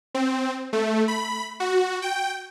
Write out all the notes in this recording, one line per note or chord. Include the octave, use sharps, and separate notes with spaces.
C4
A3
B5
F#4
G5